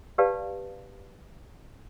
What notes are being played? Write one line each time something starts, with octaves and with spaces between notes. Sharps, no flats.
G4 B4 D5 F5 A5